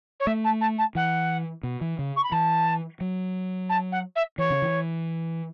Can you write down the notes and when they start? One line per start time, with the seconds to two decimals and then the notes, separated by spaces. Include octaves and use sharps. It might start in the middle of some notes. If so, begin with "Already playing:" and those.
0.20 C#5
0.27 A3 E5
0.44 A5
0.61 A5
0.78 A5
0.95 E3 F#5
1.63 B2
1.81 E3
1.99 C#3
2.16 C#6
2.24 B5
2.32 E3 A5
3.01 F#3
3.69 A5
3.92 F#5
4.15 E5
4.38 E3 C#5
4.50 C#3
4.62 E3